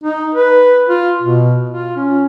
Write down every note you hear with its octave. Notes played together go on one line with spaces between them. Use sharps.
D#4
B4
F4
B2
F4
C#4